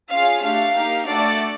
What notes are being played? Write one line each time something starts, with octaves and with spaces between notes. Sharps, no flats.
C#4 F4 G#4 F5
A3 D4 G4 F5
A#3 D#4 G4
A3 D4 F#4 A4 D5